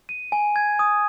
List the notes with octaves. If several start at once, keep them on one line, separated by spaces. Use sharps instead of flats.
D#7
G#5
G#6
D#6